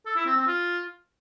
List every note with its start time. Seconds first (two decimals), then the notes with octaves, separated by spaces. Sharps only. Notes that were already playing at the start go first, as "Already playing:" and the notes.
0.06 A4
0.16 E4
0.27 C4
0.37 C4
0.47 F4